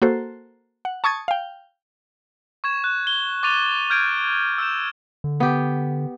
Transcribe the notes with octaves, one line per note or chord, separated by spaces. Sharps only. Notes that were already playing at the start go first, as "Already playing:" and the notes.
A#3 F#4 A4 C5
F#5
A5 C#6 D#6 G#6 A6
F5 G5
C#6 G#6 E7
F#6
G7
C#6 D6 A6 D#7 F7
F6 G6 G#6 D7
E6 G6 E7
D3
B3 G4